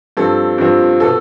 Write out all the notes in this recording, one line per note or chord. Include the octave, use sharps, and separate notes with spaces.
G2 F3 C4 A4
G2 F3 C4
B2 B3 A4